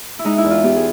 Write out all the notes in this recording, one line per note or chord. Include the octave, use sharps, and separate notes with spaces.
E4
G#3 D#4
E4
E2
F4
B3 G4
G#4